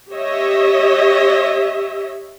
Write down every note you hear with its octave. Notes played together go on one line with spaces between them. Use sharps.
G4 C#5 D#5 E5